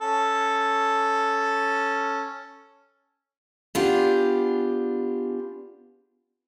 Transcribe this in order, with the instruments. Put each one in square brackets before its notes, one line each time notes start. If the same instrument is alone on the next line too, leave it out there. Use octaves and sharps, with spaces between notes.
[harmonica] C#4 A4
[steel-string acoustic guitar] B3 D4 F4 G4 G#4